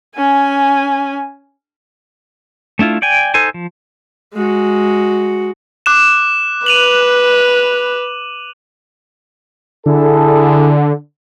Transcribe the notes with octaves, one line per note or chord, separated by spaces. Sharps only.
C#4 G#5
A3 D4 E4 F4
D5 G5 G#5
D#4 A4 C5 G#5
F3
G#3 F#4
D6 F#6 E7
B4 D#7 F7 F#7
D3 E4 G#4 A4